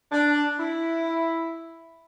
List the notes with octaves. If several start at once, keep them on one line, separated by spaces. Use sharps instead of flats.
D4
E4